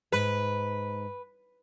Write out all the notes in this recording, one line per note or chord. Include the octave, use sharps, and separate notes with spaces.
G#2 B4